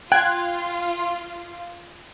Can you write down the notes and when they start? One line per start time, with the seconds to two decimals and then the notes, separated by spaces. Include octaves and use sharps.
0.12 F4 G5 F#6 G#6